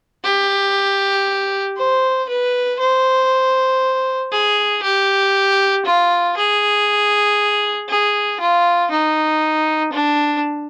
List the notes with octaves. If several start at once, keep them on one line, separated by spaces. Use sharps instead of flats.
G4
C5
B4
C5
G#4
G4
F4
G#4
G#4
F4
D#4
D4